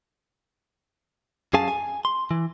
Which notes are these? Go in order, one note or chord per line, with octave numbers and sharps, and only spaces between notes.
F#2 C#4 G#4 F5 G#5 A5
G#5
C6
E3